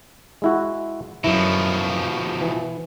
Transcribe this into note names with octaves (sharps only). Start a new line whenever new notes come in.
G#3 E4 F#4
F#2 B2 F3 E4
E3